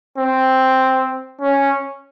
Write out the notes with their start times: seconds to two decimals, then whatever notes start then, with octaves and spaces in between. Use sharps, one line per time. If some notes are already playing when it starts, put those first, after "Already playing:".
0.17 C4
1.41 C#4